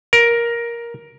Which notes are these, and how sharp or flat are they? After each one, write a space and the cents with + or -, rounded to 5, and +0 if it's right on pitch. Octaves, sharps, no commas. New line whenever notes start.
A#4 +10